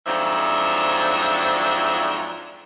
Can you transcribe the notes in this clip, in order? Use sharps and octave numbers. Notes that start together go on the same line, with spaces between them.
F2 G#2 F3 F#3 D4 E5